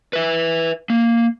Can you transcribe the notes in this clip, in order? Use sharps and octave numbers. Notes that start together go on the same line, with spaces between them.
B4 E5
A#3